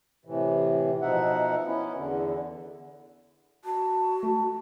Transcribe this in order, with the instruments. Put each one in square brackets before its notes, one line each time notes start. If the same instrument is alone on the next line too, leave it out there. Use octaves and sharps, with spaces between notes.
[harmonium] A2 C3 E3
B2 F3 D#4 E5 F#5
B3 C#4 E4
E2 D3
[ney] F#4 [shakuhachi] A5
[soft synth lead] A3